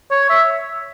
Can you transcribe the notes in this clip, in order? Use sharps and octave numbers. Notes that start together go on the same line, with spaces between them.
C#5
E5